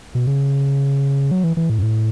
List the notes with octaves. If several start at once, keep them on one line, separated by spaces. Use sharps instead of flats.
B2
C#3
F#3
E3
E3
A2
F#2
A2